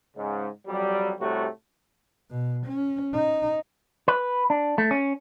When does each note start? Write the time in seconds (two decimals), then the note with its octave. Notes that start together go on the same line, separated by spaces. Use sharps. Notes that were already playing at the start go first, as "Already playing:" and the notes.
0.17 G#2 C#3
0.67 F2 F#3 G3
1.20 A2 C3 G3 A3 F#4
2.31 B2
2.66 C#4
3.14 D#4
4.08 B4
4.50 D4
4.78 A3
4.91 C#4